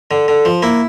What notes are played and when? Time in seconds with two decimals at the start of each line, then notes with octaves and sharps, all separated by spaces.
0.11 D3
0.28 D3
0.45 F3
0.62 A#3 E4